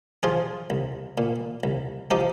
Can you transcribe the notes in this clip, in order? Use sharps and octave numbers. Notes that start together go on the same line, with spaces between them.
F3 F4 G#4
C2
A#2
C2
F3 D#4 G4